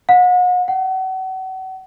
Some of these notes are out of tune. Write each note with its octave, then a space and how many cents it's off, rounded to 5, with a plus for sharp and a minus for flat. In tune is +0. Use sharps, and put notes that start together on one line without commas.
F#5 -40
F#5 +35